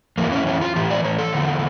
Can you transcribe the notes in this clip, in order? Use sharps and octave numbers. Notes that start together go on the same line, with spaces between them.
F2 E3 A#3
C#4
C#4
F4
A2 E3 G4
D5
C#5
A4
E2 D3 F3